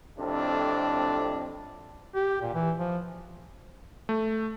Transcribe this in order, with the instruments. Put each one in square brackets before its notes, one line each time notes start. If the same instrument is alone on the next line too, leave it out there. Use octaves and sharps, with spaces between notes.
[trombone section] F2 A2 C3 D4
[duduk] G4
A#2
E3
F3
[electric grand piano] A3